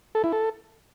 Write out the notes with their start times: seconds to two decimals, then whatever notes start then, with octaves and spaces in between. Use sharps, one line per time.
0.15 A4
0.24 E4
0.33 A4